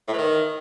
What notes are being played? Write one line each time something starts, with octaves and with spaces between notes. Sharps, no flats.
A2
E3
D#3